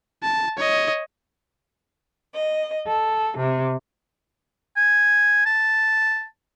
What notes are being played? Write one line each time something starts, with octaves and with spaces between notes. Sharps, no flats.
A5
C#5 D#5
D#5
A4
C3
G#5
A5